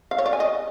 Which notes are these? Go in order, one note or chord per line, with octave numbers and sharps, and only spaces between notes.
F5
C#5
D5
G#5
D#5